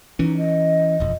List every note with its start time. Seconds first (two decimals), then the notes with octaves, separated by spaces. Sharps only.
0.19 E3 C#4 D#4
0.37 D#5
1.00 E1 F2